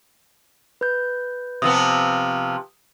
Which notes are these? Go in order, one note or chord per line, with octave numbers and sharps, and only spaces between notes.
B4 G6
C3 F3 B3 D#6 E6